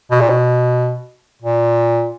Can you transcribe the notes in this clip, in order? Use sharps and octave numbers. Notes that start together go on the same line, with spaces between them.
B2
A#2
B2
A#2